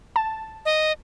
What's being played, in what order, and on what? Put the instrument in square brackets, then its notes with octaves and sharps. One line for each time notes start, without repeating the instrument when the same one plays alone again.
[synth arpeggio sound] A5
[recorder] D#5